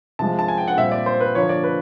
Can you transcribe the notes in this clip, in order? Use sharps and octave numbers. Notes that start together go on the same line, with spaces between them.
C3 F3 G#3 A5
A5
G#5
G5
F#5
A#2 G3 C4 E5
D5
C5
B4
D3 F3 A#3 C#5
D5
B4